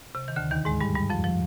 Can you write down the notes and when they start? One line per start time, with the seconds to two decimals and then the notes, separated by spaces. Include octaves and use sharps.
0.15 C3
0.28 D#3
0.36 D2 D3
0.51 D#2 D#3
0.65 G#2 G#3
0.81 G2 G3
0.95 G2 G3
1.10 F2 F3
1.24 F3